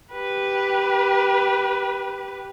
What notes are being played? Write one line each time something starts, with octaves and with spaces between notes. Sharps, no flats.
G4 B4